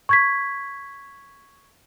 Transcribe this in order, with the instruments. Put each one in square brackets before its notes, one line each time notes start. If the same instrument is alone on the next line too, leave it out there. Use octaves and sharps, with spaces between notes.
[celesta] C#6 G#6 B6